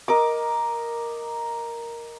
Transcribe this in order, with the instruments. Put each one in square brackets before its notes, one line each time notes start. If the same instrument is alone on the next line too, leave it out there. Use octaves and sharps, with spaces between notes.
[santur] A#4 D#5 D6